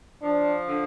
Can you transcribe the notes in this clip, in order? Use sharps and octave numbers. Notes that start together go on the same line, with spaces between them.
F3 D4
D3